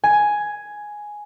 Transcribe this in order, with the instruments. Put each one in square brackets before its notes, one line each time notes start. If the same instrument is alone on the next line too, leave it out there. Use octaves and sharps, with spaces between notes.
[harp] G#5